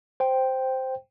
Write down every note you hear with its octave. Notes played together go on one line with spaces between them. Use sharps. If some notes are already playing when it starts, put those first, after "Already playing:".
C5 G5